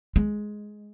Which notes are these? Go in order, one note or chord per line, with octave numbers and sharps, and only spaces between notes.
G#3